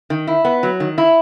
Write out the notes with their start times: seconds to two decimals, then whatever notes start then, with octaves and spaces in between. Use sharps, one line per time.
0.10 D#3
0.27 E4
0.45 B3
0.63 F#3
0.80 D#3
0.98 E4